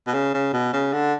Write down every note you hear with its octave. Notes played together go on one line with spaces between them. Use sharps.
B2
C#3
C#3
B2
C#3
D3